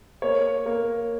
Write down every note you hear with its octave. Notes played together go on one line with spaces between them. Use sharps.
A#3 C#5
A#3